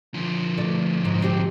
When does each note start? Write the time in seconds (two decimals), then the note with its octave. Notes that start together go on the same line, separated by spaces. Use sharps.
0.14 D3 F3
0.58 B2 A3 D5
1.05 G#2 B2
1.20 G#2 C4 G4